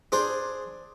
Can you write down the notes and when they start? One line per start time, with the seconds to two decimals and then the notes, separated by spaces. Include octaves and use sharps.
0.12 D4 G#4 C5